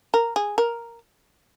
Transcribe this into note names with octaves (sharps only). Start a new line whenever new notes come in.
A#4
G#4
A#4